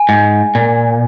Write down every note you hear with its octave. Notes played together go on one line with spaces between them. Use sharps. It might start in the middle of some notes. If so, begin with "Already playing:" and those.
Already playing: G#5
G#2
A#2